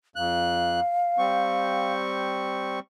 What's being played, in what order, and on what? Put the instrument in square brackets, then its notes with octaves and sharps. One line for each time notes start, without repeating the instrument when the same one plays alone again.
[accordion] F2 F#6 [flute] F5
[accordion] G3 C4 C#6